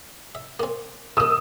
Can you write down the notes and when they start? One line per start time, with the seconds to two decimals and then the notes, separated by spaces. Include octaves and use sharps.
0.35 E5
0.60 A#3 C4
1.17 A3 A#3 D#6 E6